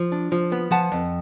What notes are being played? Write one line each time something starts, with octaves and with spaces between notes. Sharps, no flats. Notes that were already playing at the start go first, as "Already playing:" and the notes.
Already playing: F3
D4
F3
B3
F3 F#5 A5
F2